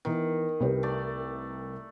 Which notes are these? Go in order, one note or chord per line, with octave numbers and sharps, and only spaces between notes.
D#3 E3 B3
C2 G4 B4
A3 D5